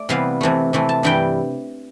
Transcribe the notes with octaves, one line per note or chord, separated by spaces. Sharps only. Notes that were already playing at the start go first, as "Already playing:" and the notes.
Already playing: A3 D5
C3 E3 G3 B3 F5
C3 E3 A3
C3 E3 A3
A5
G2 E3 G3 G5